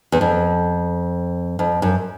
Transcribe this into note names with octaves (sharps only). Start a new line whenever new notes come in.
E2
F2
F2
F#2